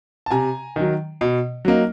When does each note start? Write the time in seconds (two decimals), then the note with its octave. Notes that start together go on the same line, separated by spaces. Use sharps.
0.26 A5
0.31 C3 G#5 A#5
0.76 D#3 F#3
1.21 B2
1.65 F#3 A#3 D#4